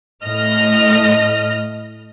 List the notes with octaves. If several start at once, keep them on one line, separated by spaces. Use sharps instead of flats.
A2 D#5 F6 A#6